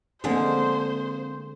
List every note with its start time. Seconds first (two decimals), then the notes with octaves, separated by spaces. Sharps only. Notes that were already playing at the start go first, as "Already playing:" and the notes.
0.24 D3 F3 G#3 A#3 C4 G#4 C5